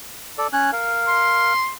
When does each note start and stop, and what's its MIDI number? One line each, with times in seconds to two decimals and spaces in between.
0.38 0.47 69
0.38 0.47 74
0.53 0.71 61
0.53 0.71 73
0.53 0.71 90
0.72 1.53 70
0.72 1.53 77
1.08 1.72 84